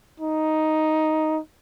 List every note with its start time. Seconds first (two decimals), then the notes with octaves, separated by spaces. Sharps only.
0.20 D#4